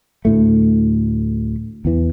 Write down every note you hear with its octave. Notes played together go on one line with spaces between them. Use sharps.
D2 A2 A3
E2 E3